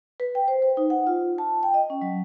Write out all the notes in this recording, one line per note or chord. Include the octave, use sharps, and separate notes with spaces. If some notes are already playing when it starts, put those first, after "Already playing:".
B4
G5
C5
C5
D#4
F#5
F4
A5
G5
D#5
C#4
F#3